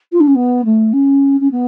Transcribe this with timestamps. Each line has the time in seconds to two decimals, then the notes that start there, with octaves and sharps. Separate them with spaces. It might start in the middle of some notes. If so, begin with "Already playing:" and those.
0.12 F4
0.20 D4
0.27 C#4
0.35 B3
0.65 A3
0.93 C#4
1.40 C#4
1.51 B3